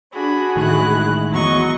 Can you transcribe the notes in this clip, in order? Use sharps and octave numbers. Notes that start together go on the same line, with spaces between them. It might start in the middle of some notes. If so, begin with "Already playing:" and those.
D4 F#4 G#4 B5
A1 A2 D#3 G#3 E4 F#6
E2 F#3 D#5 C#6